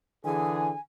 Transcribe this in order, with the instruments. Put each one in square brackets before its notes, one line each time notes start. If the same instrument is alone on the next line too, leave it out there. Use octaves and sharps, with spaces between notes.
[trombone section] D3 E3 G#4 [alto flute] G#5